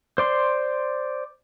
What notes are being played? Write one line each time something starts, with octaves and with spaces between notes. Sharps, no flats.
C5 D5 C6